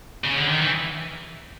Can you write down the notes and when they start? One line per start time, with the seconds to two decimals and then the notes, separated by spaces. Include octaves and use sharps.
0.24 C#3
0.36 D3
0.48 D#3
0.61 E3